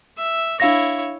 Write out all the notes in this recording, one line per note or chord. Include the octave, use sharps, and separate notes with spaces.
E5
D4 E4 C#5 F5 A#6